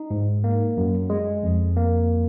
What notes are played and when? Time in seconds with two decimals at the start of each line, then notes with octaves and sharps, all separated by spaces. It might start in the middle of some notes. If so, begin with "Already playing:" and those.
Already playing: D#4
0.11 G#2
0.44 A#3
0.77 F#2
1.10 G#3
1.44 F2
1.77 A#3